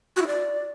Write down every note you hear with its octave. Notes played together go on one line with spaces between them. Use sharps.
F#4
E4
D5